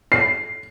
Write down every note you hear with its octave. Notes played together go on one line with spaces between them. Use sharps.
C7